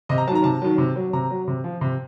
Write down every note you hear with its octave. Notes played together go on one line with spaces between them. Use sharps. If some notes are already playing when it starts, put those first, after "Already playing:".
C3 D#5
A#5
D#3 F#3 A5 A#5
C3 A5
D#3 F#3
C3
F#3
C3 A#5
F#3
C3
F3
C3